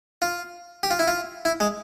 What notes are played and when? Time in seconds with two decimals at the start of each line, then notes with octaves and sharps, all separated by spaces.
0.22 F4
0.83 G4
0.91 F4
0.99 E4
1.08 F4
1.45 E4
1.60 G#3